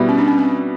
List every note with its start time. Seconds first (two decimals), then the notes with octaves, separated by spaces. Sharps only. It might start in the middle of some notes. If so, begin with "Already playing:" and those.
Already playing: B2 G3 B3 E4
0.09 C#4
0.18 D4
0.28 C#4
0.38 C4